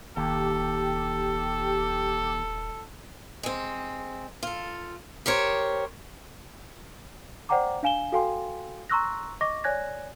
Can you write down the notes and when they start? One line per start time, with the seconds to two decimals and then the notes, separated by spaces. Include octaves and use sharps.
0.17 D#1 D#2 G4 A4
3.43 G#3 C4
4.43 F4 A4
5.26 G4 A#4 C5 C#5
7.49 C5 D5 F#5 G5 A#5 D6
7.83 D4 F5 G#5 E7 G7
8.12 F#4 A4 F5 G5 G#5 C6
8.89 A#5 C6 C#6 E6 F#6 A#6
9.41 D#5 C#6 D6 A#6
9.64 C#5 D5 G#5 F#6 G#6 A#6